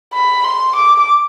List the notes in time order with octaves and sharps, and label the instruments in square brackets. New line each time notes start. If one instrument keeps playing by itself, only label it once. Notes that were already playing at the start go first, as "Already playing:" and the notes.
[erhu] B5
C6
D6